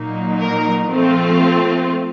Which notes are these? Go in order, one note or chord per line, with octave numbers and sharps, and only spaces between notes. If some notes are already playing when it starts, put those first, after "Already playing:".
Already playing: A#2 F#3 A#3 D#4
A#4
F3 A3 C4 F4